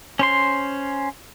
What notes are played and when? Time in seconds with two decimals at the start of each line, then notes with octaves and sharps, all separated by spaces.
0.19 C#4 C5 C6